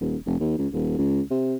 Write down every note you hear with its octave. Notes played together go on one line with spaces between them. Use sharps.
D#1
F1
D#2
C#2
D#1
C#2
C3